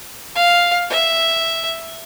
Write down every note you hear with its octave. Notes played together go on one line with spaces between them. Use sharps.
F5
E5